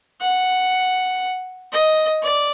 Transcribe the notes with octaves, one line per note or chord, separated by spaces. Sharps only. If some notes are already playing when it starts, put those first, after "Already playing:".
F#5
D#5
D5